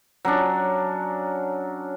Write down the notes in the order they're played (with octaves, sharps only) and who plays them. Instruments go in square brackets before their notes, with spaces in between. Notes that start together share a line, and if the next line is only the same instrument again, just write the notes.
[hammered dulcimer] F#3 C#4 D4